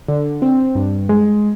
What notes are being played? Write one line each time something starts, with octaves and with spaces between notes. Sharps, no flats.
D3
C4
G2
G#3